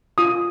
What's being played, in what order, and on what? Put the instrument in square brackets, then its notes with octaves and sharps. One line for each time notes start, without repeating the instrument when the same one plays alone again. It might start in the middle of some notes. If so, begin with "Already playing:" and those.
[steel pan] F4 D#6